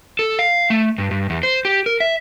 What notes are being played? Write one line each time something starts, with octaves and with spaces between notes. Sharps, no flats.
A4
F5
A3
G2
G2
E2
C5
G4
A#4
E5